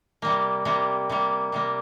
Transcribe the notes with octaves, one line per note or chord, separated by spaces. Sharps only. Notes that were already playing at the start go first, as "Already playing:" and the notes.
C3 G3 A#3
C3 G3 A#3
C3 G3 A#3
C3 G3 A#3